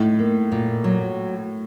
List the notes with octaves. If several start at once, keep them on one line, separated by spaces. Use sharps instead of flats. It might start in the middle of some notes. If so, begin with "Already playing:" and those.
Already playing: A2 D#4
A#3
A#2
F#3